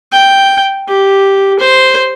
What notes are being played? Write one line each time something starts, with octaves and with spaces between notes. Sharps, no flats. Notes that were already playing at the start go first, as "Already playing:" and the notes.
G5
G4
C5